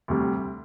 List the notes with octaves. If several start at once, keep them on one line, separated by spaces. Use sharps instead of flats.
D2 C3 G3